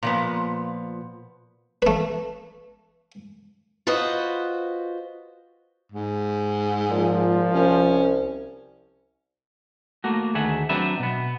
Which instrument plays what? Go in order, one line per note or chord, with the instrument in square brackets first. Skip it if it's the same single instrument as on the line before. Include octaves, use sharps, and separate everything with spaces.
[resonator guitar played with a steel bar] A#2 F3 B3
[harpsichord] A3 B4
[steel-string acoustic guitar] F4 F#4 B4 C5 D#5
[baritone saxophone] G#2
[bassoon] A#2 [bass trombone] F3
[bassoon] C2 [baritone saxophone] C#4
[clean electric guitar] A3 A#3 F#4
D2 D#3 A3 G#4 E5 F#5
F#3 C4 D4 B4 E5
B2 B3